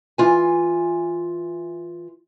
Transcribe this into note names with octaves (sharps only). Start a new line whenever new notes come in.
E3 F4 G#5